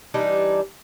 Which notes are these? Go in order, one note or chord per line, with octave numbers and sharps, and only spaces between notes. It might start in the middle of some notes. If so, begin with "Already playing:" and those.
E3 G3 D4 D#4